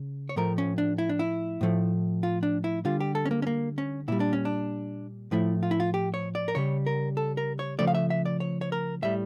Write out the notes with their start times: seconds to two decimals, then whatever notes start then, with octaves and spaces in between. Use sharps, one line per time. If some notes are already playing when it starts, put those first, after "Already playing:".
Already playing: C#3
0.29 C#5
0.36 A2 F3 A3 A#4
0.58 C#4
0.78 D4
0.98 E4
1.09 D4
1.19 E4
1.61 A2 F3 A3
2.23 F4
2.43 D4
2.64 E4
2.85 D3 G3 F4
3.00 G4
3.15 A4
3.25 C#4
3.31 A#3
3.42 C#4
3.47 A#3
3.78 C#4
4.08 A#2 G3 E4
4.20 D4
4.33 C#4
4.45 D4
5.31 A2 F3 A3 E4
5.63 F4
5.71 E4
5.80 F4
5.94 G4
6.14 C#5
6.35 D5
6.48 A#4
6.55 C#3 G3 C#5
6.86 A#4
7.17 A4
7.37 A#4
7.59 C#5
7.79 C#3 F3 A3 D5
7.87 F5
7.95 E5
8.10 E5
8.26 D5
8.40 C#5
8.61 C#5
8.72 A#4
9.02 A2 G3 E5